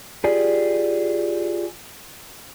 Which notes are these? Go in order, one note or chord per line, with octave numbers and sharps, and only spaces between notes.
F4 G4 G#4 D5